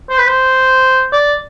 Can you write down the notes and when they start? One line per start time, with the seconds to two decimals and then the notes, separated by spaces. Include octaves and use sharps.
0.10 C5
0.18 B4
0.27 C5
1.12 D5